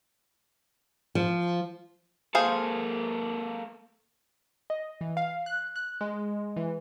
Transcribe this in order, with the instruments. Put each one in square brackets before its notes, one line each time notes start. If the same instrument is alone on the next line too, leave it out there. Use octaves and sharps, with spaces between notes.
[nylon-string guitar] F3
[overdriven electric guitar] A#3 A4 [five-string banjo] G#4 C5 F5
[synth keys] D#5
E3
F5
F#6
F#6
G#3
E3